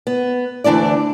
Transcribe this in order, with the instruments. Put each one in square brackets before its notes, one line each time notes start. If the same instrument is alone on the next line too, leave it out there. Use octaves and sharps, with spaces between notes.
[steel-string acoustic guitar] B3
D2 E3 D4 E4 D5